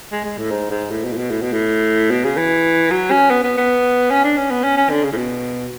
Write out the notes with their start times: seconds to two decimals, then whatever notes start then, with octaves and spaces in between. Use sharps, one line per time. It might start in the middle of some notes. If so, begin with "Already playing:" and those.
0.12 G#3
0.25 G#3
0.38 A2
0.51 G#2
0.71 G#2
0.91 A2
1.05 B2
1.13 A2
1.17 B2
1.31 A2
1.42 B2
1.53 A2
2.11 B2
2.24 C#3
2.37 E3
2.91 F#3
3.11 C#4
3.30 B3
3.44 B3
3.57 B3
4.11 C#4
4.24 D4
4.37 C#4
4.51 B3
4.64 C#4
4.77 C#4
4.90 D3
5.04 C#3
5.12 A2
5.17 B2